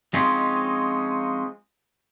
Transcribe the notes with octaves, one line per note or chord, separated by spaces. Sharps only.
F3 G#3 C4 C#4 D#4 F4